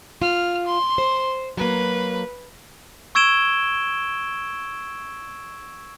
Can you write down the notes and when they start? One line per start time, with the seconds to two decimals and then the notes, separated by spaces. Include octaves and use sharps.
0.22 F4 F6
0.66 C6
0.98 C5
1.57 F#3 A#3 B4
3.15 C#6 E6 G#6 D7 E7 G7